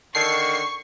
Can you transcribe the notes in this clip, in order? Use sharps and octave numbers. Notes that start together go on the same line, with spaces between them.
D3 D#3 C#6 C7